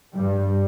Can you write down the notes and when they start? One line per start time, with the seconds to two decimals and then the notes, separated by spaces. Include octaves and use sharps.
0.14 G2 G3